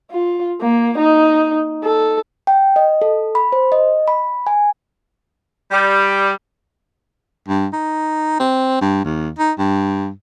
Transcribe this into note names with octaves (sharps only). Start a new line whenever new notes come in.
F4
A#3
D#4
A4
G5
D#5
A4
B5
C5
D#5
B5
G#5
G3
G2
D#4
C4
G2
D#2
D#4
G2